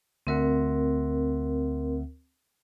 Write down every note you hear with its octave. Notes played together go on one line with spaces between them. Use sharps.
D2 C4 A#4 E5 F#5